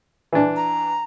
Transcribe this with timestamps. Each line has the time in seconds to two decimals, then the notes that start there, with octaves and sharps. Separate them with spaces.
0.33 E3 D4
0.56 A#5